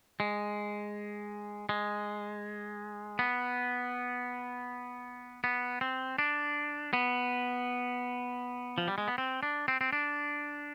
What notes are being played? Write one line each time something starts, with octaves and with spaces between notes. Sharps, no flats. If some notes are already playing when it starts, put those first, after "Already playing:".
G#3
G#3
B3
B3
C4
D4
B3
F3
G3
G#3
B3
C4
D4
C4
C4
D4